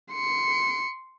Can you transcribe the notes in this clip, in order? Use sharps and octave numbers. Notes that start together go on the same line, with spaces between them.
C6 C#7